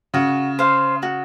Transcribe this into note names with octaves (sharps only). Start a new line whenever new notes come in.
C#3 F#4
C5 F5
F#4